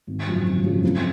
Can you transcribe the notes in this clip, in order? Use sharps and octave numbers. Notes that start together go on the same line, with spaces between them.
G#1
F#2 C#3 F3
G#1
F#2 C#3 F3
F2